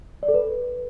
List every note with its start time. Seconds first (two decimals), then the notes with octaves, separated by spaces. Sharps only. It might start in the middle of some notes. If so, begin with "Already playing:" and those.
0.23 D5
0.28 A4
0.34 B4